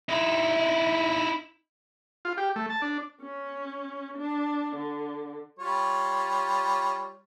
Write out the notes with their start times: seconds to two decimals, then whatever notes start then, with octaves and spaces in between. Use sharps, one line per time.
0.09 D#4 E4
2.25 F4
2.37 G4
2.56 A3
2.70 A5
2.82 D4
3.21 C#4
4.17 D4
4.76 D3
5.59 G3 F4 C#5